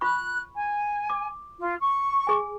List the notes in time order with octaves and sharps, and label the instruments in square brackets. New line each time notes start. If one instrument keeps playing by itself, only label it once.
[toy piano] F4 B5 C#6 [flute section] F#6
[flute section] G#5
[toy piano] D6
[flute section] F4
C#6
[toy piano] G#4 G#5